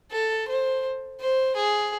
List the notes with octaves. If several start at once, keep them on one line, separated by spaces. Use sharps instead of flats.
A4
C5
C5
G#4